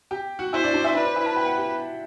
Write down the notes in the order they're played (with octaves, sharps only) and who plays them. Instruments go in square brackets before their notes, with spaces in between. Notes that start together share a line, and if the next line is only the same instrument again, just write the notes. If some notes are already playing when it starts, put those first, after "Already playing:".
[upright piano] G4 G5
F#4 F#5
[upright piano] E4 E5 [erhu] C5
[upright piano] D4 D5
D4 D5
E4 E5
[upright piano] D4 D5 [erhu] B4
[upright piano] C5
E4 E5
A5
G5
F#5
G4 G5